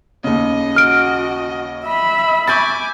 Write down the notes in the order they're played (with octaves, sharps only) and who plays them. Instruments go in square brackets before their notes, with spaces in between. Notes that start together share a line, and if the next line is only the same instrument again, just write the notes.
[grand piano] D#2 C#3 [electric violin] D#5
[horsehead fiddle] F#4 [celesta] F6 D7
[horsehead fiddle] E5 B5
[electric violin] G#5 D6 [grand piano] C#6 G6 A6